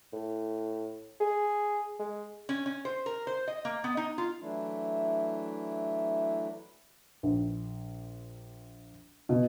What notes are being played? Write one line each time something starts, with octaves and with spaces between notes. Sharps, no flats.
A2
G#4
G#3
C#4
C#4
C5
A#4
C5
D#5
A#3
B3
D#4
F4
E3 F#3 A3 D4 E4
A#1
B2